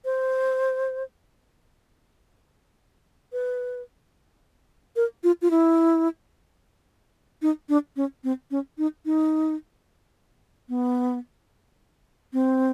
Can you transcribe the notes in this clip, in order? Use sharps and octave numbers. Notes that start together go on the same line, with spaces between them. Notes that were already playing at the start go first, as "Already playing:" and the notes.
C5
B4
A#4
F4
F4
E4
D#4
D4
C#4
C4
C#4
D#4
D#4
B3
C4